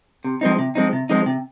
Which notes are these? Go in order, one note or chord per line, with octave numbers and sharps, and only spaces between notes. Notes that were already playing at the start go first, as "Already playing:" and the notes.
C3
F3 G#3 C4 D#4
C3
F3 G#3 C4 D#4
C3
F3 G#3 C4 D#4
C3